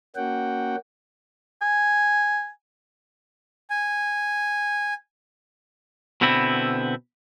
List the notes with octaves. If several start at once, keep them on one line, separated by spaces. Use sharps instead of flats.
A#3 C#4 F#4 F#5 G5
G#5
G#5
B2 D3 B3 C4 E4